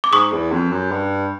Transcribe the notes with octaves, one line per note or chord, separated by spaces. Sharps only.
D6
G#2 C#6 D#6
E2
F2
F#2
G2